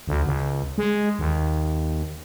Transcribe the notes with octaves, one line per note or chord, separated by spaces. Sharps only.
D2
C#2
G#3
D#2